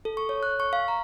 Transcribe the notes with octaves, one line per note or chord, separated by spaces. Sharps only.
A4
C#6
C#5
F#6
C#6
F5
A#5